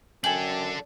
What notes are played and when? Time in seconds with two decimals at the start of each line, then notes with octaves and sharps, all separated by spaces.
0.24 F#2 D4 A4 G5 G#5 F#7